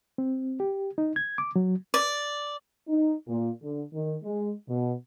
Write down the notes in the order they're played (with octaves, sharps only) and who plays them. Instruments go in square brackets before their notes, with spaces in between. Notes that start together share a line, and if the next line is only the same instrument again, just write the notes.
[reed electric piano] C4
G4
D#4
G#6
D6
F#3
[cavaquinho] D5
[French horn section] D#4
A#2
D3
D#3
G#3
B2